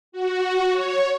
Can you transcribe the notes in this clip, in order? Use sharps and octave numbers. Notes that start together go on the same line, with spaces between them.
F#4
C#5